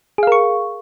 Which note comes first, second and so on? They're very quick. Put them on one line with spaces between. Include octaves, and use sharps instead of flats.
G#4 F5 A#4 C#6